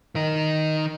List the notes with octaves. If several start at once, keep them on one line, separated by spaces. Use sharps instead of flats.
D#3 D#4